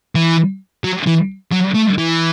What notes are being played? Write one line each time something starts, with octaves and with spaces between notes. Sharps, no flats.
E3
F#3
E3
F#3
A3
E3